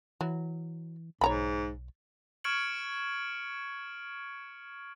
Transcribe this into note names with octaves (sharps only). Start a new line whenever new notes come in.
E3 F#3
B1 G#2 C#5 A#5 B5
C#6 F6 G#6 C#7 D7 F#7